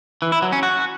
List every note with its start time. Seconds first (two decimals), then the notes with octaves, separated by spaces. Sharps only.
0.22 E3
0.32 E4
0.42 F#3
0.53 C#4
0.63 F#4